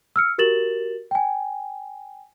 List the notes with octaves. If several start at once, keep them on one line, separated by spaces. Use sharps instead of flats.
E6 F6 C#7
F#4 G4 A#4 A6 E7 F#7
G5 G#5